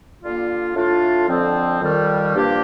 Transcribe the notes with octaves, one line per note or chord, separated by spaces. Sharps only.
D3 G3 A#3 F4
A2 A3 D4 F4
F2 D3 F3 C4
F2 D#3 G3
G2 F3 A#3 D4 G4